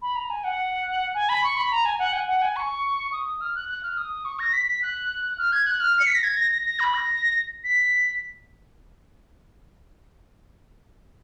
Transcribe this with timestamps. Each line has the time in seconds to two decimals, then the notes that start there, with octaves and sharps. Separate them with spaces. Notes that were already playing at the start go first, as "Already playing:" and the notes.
0.02 B5
0.16 A#5
0.30 G#5
0.44 F#5
1.15 G#5
1.29 B5
1.44 C#6
1.57 B5
1.72 A#5
1.85 G#5
1.99 F#5
2.13 G#5
2.28 F#5
2.42 G#5
2.56 C#6
3.12 D#6
3.41 F6
3.55 F#6
3.69 F#6
3.83 F6
3.97 D#6
4.25 C#6
4.39 A#6
4.53 B6
4.67 B6
4.83 F#6
5.38 F6
5.52 G#6
5.67 F#6
5.80 F6
6.00 C#7
6.07 B6
6.15 A#6
6.24 G#6
6.37 A#6
6.52 A#6
6.65 A#6
6.80 B5
6.94 A#6
7.64 B6